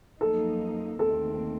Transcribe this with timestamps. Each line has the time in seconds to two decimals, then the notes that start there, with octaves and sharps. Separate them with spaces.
0.20 F#2 F3 A#3 D#4 A4
0.99 D#2 D#3 A3 C4 A4